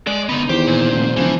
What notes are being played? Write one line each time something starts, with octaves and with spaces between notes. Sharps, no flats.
G#3 D5
D3 B3 D#5 A#5
E2 D#3 G4 C5
A#2
F1
E1 C#3 E3 F3